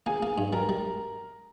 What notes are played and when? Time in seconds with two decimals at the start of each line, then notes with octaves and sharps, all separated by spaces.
0.06 A#3 G#4 G#5
0.23 A#3
0.38 G2
0.53 G3 A#4 A#5
0.69 G3